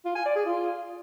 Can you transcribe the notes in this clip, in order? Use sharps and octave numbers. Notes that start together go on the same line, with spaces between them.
F4
G#5
D5
G#4
F4